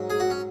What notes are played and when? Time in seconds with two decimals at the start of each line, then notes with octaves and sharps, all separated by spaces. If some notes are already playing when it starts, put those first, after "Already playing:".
Already playing: G#2 F#3
0.10 G#4
0.20 F#4
0.30 C#4